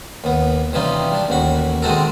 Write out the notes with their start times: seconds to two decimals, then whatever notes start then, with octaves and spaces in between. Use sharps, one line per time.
0.24 D#2 B3
0.73 C3 E3 G3 C#4 D#4 F4
1.12 G3 D4
1.28 A1 D#2 F#4 B5
1.82 D#3 G#3 C4 F#4 A4 A#4